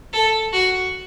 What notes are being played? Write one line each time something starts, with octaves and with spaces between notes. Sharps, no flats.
A4
F#4